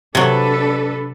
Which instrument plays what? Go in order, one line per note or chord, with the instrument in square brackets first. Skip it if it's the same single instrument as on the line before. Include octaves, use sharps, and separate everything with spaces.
[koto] C3 F#3 [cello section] D4 A4 B4